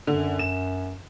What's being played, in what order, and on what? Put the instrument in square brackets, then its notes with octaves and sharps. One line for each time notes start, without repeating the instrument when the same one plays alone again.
[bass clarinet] F#2 [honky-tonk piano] D3
[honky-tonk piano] E7